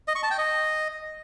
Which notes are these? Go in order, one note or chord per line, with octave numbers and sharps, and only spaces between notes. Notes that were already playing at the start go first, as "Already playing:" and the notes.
D#5
C#6
A5
G5
D#5